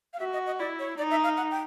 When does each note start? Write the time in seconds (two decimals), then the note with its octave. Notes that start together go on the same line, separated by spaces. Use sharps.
0.13 F5
0.20 F#4 E5
0.33 D#5
0.46 D#5
0.59 E4 D5
0.79 C#5
0.98 D#4 D5
1.11 E5
1.24 F5
1.37 F#5
1.51 G5